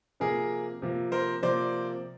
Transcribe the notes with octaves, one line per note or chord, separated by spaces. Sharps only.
C3 F3 A#3 G#4 A#4
C3 F3 A#3
A#4 C5
C3 F3 A#3 C5 D5